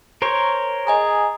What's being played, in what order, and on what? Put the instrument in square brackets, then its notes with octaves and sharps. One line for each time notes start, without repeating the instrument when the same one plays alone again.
[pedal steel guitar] A#4 C5 C#5
[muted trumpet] G#4 [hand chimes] D#5 G#5 A#5